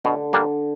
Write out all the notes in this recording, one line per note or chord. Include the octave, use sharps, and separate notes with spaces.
B2 D3
G3 A#3 D4